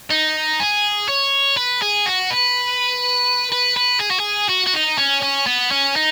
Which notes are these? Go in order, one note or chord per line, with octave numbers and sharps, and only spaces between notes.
D#4
G#4
C#5
B4
G#4
F#4
B4
B4
B4
G#4
F#4
G#4
F#4
F#4
D#4
C#4
C#4
B3
C#4
D#4